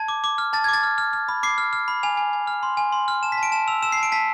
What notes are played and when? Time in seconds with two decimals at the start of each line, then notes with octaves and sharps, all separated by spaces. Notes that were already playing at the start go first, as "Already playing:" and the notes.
Already playing: A5 G#6
0.08 D6
0.24 D6
0.38 F6
0.53 A5 A6
0.64 D6 G#6
0.73 A6
0.83 F6
0.98 F6
1.13 F6
1.29 B5
1.43 D6 C7
1.58 F6
1.73 F6
1.88 B5
2.03 G#5 F7
2.17 G#5
2.33 G#5
2.47 F6
2.63 C6
2.77 G#5
2.92 C6
3.08 F6
3.23 A5 E7
3.32 B6
3.38 A5
3.43 D7
3.52 A5 E7
3.68 E6 F7
3.82 E6 E7
3.92 A5 C7
4.03 D7
4.12 A5 B6